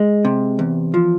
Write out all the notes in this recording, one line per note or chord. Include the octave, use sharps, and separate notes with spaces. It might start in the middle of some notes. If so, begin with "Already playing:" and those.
Already playing: G#3
C3
E2
F3